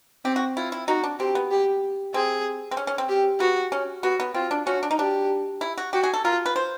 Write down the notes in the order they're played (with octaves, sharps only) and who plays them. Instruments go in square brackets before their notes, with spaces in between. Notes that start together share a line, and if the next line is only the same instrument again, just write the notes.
[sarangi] C4 [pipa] G4
[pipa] F#4
[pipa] E4 [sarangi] F4
[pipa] E4
[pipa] D#4 [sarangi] F#4
[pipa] D4
[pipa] C4 [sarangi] G4
[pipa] B3
[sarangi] G4
[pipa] C4 [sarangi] G#4
[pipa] C4
C#4
C#4
C4
[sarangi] G4
[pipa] B3 [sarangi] F#4
[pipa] C#4
[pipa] B3 [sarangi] F#4
[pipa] B3
[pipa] C4 [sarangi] F4
[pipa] D4
[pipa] C#4 [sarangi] F#4
[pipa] D4
D#4
[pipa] D4 [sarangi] G4
[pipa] E4
F#4
[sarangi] F#4 [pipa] G4
[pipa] G#4
A4
[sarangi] F4 [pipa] A#4
[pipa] B4
C5